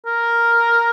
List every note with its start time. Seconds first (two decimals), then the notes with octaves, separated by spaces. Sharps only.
0.06 A#4